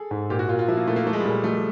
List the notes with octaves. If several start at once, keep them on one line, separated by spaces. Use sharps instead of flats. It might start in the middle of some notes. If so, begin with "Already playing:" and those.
Already playing: G#4 A4
G#2
A#2 G4
F#4
A#2 F4
F4
F3 E4
A#3
A#2 A3
A#3
F3 A3
G#3
G3
A#2 G#3
F3 A3